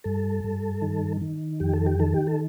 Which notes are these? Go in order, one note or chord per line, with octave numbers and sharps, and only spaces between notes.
G2 A4
G2
D#3
D#3
F2 G4
A4
G4
D#3 A4
G4
A4